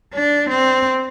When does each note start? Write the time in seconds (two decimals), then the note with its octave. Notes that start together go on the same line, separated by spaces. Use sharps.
0.14 D4
0.49 C4